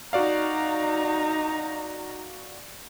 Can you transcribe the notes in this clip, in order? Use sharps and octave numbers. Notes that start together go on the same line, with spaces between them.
D#4 F#4 D5 F5 A#5